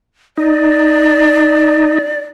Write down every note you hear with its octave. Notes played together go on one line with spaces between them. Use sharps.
D#4 D5